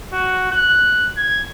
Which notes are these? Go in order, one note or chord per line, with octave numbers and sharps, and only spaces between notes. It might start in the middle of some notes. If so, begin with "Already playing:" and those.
F#4
F#6
G#6